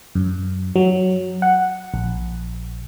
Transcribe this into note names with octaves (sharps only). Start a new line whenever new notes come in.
F#2
F#3
F#5
A#1